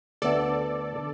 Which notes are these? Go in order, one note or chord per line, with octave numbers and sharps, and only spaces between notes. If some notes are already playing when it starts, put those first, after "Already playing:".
D2 D3 B3 D4 A4 D5
D3